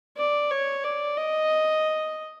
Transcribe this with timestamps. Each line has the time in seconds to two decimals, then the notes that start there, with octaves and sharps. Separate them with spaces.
0.17 D5
0.51 C#5
0.84 D5
1.17 D#5